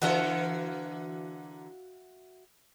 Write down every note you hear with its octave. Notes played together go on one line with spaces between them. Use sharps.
D3 E3 F#4 A#4 E5 F5